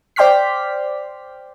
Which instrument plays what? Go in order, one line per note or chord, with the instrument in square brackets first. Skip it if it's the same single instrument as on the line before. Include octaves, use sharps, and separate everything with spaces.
[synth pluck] C5 D5 G5 C6 F6 B6